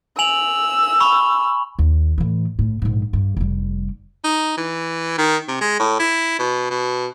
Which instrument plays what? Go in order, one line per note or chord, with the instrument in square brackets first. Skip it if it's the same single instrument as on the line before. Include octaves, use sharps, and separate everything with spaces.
[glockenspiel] G#5 F7 F#7 [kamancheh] E6
[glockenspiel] B5 C#6
[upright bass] D#2
A2 E3
A2
A#1 G#2
G2
F1 G3
[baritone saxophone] D#4
E3
D#3
C3
G#3
A2
E4
B2
B2